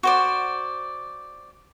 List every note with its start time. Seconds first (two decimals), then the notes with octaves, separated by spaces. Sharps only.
0.03 F#4 C5 D5